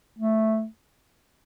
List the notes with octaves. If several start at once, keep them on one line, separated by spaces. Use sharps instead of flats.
A3